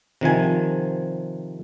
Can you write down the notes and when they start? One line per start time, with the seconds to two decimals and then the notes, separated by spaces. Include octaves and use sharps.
0.21 C3 D#3 F3 G#5